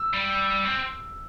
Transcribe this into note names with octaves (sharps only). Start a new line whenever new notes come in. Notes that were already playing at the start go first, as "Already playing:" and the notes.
Already playing: E6
G3
C4